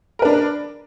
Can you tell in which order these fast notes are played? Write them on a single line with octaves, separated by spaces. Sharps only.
A#4 B4 D4